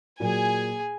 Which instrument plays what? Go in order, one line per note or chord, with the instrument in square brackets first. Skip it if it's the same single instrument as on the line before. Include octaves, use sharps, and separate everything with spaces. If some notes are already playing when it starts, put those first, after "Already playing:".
[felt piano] A#2 F#3 A#3 [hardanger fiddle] G#4 G#5